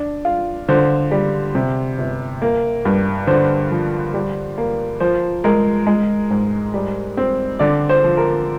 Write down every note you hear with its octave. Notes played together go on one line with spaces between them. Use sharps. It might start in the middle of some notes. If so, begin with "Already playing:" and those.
Already playing: D4
F4
D3 C5
G3
C3
G1
A#3
G2
D3 C5
F3
G3
A#3
F3 C5
G#3 A#4
G#3
G#2
G3
C4
D3 D5
C5
F3
A#4